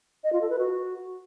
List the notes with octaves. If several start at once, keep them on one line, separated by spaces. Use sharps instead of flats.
D#5
F4
A4
B4
F#4